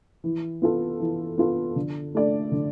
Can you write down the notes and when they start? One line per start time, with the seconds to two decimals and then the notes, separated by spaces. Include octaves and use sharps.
0.24 E3
0.62 B3 F4 A4
1.00 E3
1.38 B3 F4 A4
1.76 D3
2.15 A3 D4 A4 D5
2.52 D3